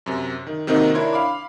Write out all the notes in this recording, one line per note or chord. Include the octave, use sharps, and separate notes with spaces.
F#2 C3
D#3
C3 D#3 A#3 C4 D#4 F#4
D4 E4 A#4 C#5 C6
F5 B5 D6